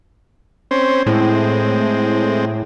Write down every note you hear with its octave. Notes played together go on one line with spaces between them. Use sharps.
C4 C#4 C5
A2 G#3 C4